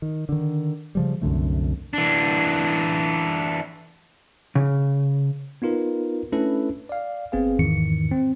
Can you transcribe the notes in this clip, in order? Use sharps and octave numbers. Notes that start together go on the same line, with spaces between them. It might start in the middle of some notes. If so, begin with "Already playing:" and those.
D#3
D3 D#3
C#3 F3 G3
C2 F#2 D3 A3
E3 D4
C#3
B3 D#4 F4 A#4 B4
A3 C#4 D4 E4 A4 B4
D5 F5
G1 B3 C4 G#4 B4 F5
E2 G#2 D#3 E3 C#7
C4